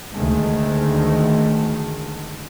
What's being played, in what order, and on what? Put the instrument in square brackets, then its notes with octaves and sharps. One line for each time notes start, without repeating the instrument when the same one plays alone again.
[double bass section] D2 D#3 G#3 A3